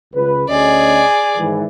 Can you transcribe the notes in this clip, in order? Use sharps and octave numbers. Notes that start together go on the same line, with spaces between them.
C#2 B4
D2 C#4 G#4 D5 D#5
G#2 D#3 E3